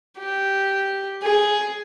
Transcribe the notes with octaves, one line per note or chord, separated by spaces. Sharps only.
G4
G#4